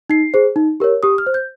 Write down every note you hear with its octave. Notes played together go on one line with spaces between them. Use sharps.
D#4 C7
G#4 C5
D#4
G4 A#4 C#5
G4 D#6
F6
C5
G6